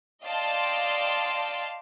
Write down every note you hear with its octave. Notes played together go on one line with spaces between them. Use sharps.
D5 D#5 F5 G5 A5 C6